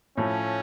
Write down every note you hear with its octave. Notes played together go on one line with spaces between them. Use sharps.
A2 F3 A3 C#4